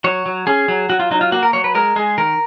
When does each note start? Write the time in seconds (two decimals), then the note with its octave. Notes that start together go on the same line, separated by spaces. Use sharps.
0.04 F#3 C#5
0.26 F#3
0.47 C#4 G#4
0.68 F#3
0.90 F#3 F#4
1.00 F4
1.11 F#3 D#4
1.21 F4
1.32 A#3 F#4
1.43 A#4
1.53 F#3 C#5
1.64 B4
1.75 G#3 A#4
1.96 G#3 G#4
2.18 D#3 A#4